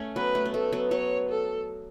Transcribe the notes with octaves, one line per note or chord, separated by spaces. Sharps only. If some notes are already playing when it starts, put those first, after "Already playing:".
Already playing: A3 C#4
F#3 B3 B4
A3
B3
A3 A4
F#3 B3
F#3 B3 C#5
A4